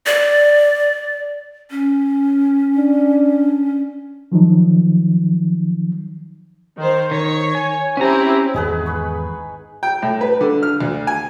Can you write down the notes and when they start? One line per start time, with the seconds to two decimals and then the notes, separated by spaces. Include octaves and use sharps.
0.06 D5
1.71 C#4
2.77 D4
4.32 D#3 F3 F#3 D#4
6.77 D#3 C5
7.11 D#3 C#5
7.55 G#5
7.97 C4 C#4 E4 G4 A#5
8.54 G#1 E2 D3 D#4 G#4 B4
8.86 B5 C#6
9.83 G5
10.02 A2
10.21 B4
10.41 D3
10.63 F6
10.80 D2
11.07 G#5